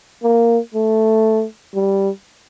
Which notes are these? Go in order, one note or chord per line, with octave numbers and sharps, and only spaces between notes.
A#3
A3
G3